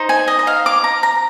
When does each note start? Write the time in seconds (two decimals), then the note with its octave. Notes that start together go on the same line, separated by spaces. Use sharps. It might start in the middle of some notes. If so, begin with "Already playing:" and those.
Already playing: D#4 C5
0.09 G#5
0.28 D#5
0.39 D#5
0.47 F5
0.66 D6
0.84 A#5
1.03 A#5